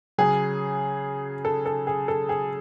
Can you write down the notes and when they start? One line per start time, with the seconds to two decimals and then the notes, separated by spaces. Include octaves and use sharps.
0.18 C#3 F#3 G#4
1.45 A4
1.66 A4
1.87 G#4
2.08 A4
2.29 G#4